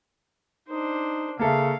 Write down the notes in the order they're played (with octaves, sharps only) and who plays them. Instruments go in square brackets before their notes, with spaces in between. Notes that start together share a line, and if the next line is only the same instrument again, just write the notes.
[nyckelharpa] D4 C5 [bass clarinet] D#4
[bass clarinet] C#3 [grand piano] A#3 A4 E5 [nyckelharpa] F5